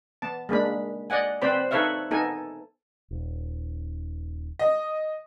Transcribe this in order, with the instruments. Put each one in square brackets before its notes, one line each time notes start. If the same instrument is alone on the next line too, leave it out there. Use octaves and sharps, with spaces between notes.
[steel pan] B3 A5
G#3 A#3 D4 B5
D5 D#5 F#5 G#5
C4 B4 C5 D5 B5
D#4 A4 B4 C#5 E5 F5
B3 D#4 A4 G#5
[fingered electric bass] D#1
[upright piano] D#5